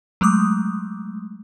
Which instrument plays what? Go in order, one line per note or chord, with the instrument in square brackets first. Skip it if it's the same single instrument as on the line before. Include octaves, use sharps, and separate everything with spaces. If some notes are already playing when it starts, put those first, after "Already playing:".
[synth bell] F#3 G#3 A3 D6 D#6